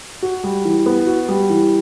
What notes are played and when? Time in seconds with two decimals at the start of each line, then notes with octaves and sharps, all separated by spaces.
0.22 F#4
0.44 G3
0.65 E3
0.86 B3
1.07 F#4
1.29 G3
1.50 E3